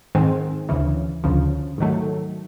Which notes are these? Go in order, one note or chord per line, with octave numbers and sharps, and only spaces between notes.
G#2 D#3 G#3 C4
D2 C#3 E3
D2 C#3 F3
G#2 D#3 F#3 A3